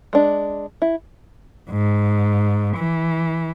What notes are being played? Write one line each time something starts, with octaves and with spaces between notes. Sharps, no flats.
G#3 D4
E4
G#2
E3